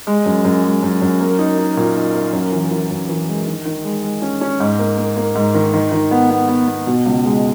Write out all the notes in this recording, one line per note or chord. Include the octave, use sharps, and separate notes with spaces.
G#3
F#2
F#2
G#3
F#2
F#2
A#3
D#4
D#4
A#2
D#4
A#3
F#2
E3
E3
F#2
E3
G#3
D#3
D#3
G#3
G#3
C#4
C#4
G#2
A#3
A#3
A#3
G#2
D#3
D#3
D#3
B3
B3
B3
B3
B2
C#2
G#3